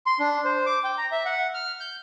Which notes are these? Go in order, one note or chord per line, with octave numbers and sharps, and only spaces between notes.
C6
D4
C5
D6
G5
A#5
E5
F#5
F6
G6